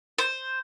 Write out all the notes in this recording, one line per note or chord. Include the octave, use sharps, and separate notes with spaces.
C5